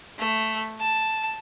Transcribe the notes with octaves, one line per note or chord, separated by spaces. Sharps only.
A3
A5